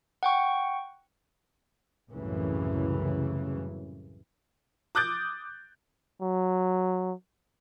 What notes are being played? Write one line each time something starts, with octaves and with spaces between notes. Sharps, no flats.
F#5 G5 C#6
C2 F#2 A2 C#3 E3
D6 D#6 F#6 G6 A6 D7
F#3